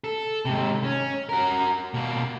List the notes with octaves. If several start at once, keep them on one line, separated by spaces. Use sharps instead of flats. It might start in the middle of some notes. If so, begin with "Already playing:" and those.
A4
G#2 C3
C#4
F#4 A#4
B2 A#3